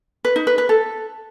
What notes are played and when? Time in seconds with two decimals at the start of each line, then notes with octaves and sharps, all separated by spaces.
0.25 B4
0.36 D#4
0.47 B4
0.58 B4
0.69 A4